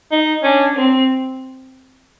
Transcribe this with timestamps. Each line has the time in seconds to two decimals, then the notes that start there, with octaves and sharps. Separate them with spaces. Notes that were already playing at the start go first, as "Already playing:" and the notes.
0.12 D#4
0.43 C#4 D4
0.76 C4